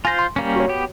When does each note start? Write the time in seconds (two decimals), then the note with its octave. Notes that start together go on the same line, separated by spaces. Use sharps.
0.05 F4 C5 G#5 A#6
0.19 C6
0.36 G3 A#3 C#4
0.56 F#4 C#5
0.68 B3 G4